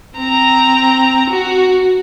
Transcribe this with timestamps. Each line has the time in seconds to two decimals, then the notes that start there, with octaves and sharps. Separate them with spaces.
0.18 C4 A#5
1.30 F#4